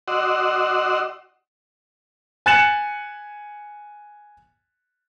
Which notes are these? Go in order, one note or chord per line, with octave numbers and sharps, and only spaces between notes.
F#4 D5 D#5 F#5 C6 E6
G#5 F#6 A6 C#7 E7 F#7